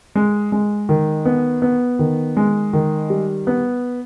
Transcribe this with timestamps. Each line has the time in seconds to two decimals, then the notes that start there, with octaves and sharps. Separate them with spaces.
0.15 G#3
0.52 G#3
0.89 D#3
1.25 B3
1.62 B3
1.99 D#3
2.37 G#3
2.73 D#3
3.10 G3
3.47 B3